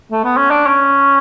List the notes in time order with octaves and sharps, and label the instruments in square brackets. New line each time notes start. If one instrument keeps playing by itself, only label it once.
[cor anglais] A3
B3
C#4
D4
C#4